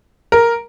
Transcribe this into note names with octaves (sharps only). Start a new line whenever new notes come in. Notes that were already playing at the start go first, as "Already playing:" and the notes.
A#4